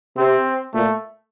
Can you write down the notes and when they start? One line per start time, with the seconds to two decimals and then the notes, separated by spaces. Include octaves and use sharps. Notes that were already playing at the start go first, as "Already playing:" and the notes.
0.17 C3 C4
0.74 A#2 A3